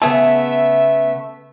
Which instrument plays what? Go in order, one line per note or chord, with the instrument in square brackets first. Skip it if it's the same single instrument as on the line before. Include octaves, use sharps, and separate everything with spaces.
[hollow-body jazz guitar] C#3 B3 A5 [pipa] A3 G#4 [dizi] E5